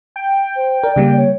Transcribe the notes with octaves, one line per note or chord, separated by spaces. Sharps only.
G5
C5
A#4 D5
C#3 G3 A#3 D5
C#5